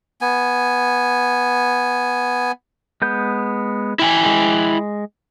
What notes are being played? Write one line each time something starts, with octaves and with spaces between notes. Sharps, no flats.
B3 G#5
G#3 B3 G6
E4 G5 G#5
G#3